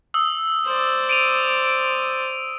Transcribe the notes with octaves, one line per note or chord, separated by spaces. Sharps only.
D#6 E6
C5 D5
D7 D#7 F7